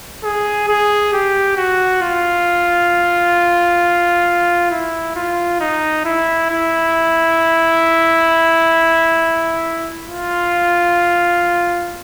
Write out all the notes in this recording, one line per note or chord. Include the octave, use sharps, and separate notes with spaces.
G#4
G#4
G4
F#4
F4
E4
F4
D#4
E4
E4
F4